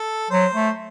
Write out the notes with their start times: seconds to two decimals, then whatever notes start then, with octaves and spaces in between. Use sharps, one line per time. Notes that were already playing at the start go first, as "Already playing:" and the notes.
Already playing: A4
0.30 F#3 C5
0.54 A3